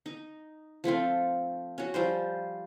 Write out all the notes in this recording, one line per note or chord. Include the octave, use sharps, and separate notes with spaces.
D#4
F3 A3 C4 F4
C#4 F#4
F3 G3 C5